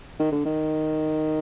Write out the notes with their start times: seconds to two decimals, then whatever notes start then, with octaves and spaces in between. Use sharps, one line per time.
0.19 D#3
0.32 D3
0.45 D#3